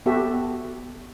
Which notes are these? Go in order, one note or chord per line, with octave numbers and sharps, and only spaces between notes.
B3 F#4 G4 A4 E5